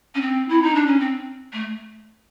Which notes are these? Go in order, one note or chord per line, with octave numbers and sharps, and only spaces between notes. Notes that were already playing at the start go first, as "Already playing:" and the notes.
C#4
C4
E4
D#4
D4
C#4
C4
A3